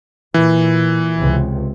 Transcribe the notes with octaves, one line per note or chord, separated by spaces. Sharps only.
A#2 E3
C#2 C3